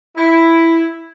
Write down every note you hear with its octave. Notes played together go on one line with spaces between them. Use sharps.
E4